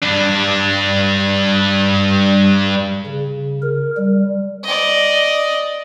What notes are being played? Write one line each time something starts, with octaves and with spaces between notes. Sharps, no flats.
G2 D4
C#3
A#4
G3
D5 D#5